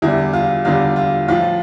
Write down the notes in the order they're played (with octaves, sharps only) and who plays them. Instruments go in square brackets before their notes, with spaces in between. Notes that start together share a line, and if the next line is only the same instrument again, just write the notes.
[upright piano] E2 D3 G3 E4
F4
E2 D3 G3 F4
F4
A2 F3 F4